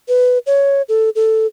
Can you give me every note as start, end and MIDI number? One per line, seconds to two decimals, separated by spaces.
0.08 0.38 71
0.46 0.82 73
0.89 1.10 69
1.16 1.47 69